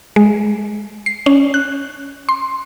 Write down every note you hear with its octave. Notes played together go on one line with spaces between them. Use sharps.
G#3
C7
C#4
F#6
C6